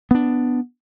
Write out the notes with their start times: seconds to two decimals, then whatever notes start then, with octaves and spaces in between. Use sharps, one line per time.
0.11 B3 D4